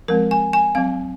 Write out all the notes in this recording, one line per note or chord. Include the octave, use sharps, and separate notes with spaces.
F3 G#3 C4 A#4
G#5
G#5
F#3 C4 F5